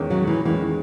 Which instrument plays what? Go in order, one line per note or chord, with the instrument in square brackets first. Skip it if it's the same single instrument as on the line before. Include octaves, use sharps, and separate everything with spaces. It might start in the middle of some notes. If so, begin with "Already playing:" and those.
Already playing: [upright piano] E2 D#3 G#3 C#4
[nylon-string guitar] F#3
E3
[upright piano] E2 D#3 G#3 C#4 [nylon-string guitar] E3